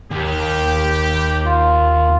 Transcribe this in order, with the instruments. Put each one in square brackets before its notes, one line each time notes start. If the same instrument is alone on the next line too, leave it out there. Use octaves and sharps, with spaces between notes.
[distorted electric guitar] D#2 [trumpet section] G4
[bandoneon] F4